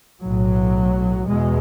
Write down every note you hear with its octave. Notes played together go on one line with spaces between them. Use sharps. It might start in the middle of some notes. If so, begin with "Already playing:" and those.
B1 A2 F#3
E2 B2 G#3